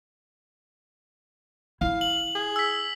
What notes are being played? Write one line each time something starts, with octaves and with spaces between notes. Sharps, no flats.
E4 F5
F#7
G#4
E6 B6